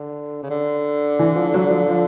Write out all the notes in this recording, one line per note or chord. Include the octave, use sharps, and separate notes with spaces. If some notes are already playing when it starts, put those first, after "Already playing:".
Already playing: D3
C#3
D3
E3
F3
F#3
F3
F3